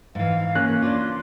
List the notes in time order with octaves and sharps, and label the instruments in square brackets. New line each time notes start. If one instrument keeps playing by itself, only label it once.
[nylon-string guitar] G#2 E3 [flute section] F5
[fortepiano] A#3 C#4 F#6
[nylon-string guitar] D4 F4 [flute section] C6 D6